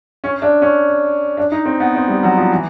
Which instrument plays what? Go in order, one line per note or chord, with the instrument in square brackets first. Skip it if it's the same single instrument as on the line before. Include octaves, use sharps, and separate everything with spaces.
[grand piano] C#4
D4
C#4
D4
D#4
C4
B3
C4
G3
F#3
F3
E3